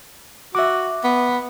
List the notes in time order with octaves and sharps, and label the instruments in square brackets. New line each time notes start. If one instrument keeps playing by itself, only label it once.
[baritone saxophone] F#4 [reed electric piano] E5 D6
[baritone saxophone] B3